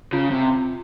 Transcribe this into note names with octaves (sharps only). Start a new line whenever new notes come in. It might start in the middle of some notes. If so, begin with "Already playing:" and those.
C#3 F4
C3